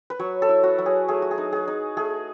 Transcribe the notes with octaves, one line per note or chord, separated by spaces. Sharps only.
B4
F#3 C#5
A4
E4
F#4
F#3
G#4
A3 G#4
F#4
G#4
D#4
G#4
D#4
A3 G#4